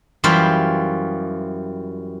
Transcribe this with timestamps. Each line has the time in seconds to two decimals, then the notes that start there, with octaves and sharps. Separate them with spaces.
0.24 F#2 E3 G3 F4 C5 B5